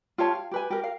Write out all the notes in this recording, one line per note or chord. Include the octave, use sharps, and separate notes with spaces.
F4 G4 C#5 A5
F5
G4 B4 G#5
G4 A#4
A#4 F5